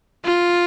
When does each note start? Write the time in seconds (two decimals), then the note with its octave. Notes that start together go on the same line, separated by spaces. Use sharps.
0.25 F4